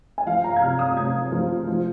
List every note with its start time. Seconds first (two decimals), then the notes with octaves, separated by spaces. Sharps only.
0.18 G#5
0.27 F3 F5
0.44 A#5
0.56 G#6
0.62 C3 F6
0.79 D#6
0.97 C3 G#6
1.32 F3
1.67 F3